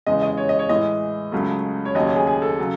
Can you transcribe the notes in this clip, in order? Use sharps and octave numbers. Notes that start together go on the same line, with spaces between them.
E2 C#3 G#3 D#5
D#5
C#5
D#5
C#5
A2 E3 G#3 D#5
C#2 C#3 F#3 A3
C#5
D#2 C#3 F#3 A3 D#5
C#5
G#4
G#4
A4
C#3 F#3